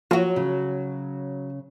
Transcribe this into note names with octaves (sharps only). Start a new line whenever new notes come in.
F3 F#3 A#3 F4 F#4
C#3